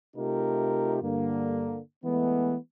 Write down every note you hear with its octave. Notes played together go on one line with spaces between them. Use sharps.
C3 A3 D#4 F4 G4 A#4
G2 D3 A#3
E3 G#3 A3 B3